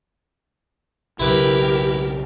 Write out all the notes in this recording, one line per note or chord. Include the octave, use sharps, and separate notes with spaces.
B1 C#3 F#3 E4 G4 A#4 B4 D6